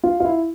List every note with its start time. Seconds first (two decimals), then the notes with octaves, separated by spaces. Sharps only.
0.04 F4
0.20 F4
0.25 E4